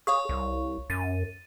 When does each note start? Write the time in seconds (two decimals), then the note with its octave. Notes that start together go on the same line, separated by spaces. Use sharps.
0.07 G#4 C#5 F5 C#6
0.29 C2
0.90 F#2 A6 D#7